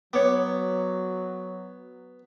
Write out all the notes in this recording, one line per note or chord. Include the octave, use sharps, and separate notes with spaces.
F#3 B3 C#5 D6